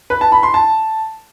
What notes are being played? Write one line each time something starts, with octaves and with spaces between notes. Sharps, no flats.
B4
A5
B5
C6
A5